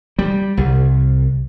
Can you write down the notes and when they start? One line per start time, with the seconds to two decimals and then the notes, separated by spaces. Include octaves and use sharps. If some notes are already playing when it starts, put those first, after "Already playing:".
0.19 G3
0.57 C2